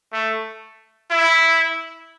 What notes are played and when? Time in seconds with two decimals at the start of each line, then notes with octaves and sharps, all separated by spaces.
0.13 A3
1.11 E4